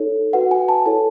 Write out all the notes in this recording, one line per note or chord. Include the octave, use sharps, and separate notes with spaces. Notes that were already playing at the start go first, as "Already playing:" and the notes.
Already playing: D#4 A4 C#5
F#4 B4 F#5
G#5
A5
E4 A4 C#5 A5